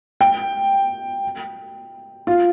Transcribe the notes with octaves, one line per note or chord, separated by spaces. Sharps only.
G5
F4